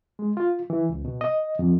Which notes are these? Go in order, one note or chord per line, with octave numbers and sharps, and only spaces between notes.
G#3
F4
E3
C#2
B2
D#5
F2